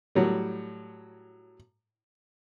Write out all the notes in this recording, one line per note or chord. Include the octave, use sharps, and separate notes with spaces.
A2 F#3 G3